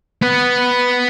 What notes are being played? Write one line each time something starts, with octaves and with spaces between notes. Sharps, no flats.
B3 B4